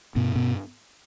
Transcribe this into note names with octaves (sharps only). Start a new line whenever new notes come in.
G2 B2 B3
B2 B3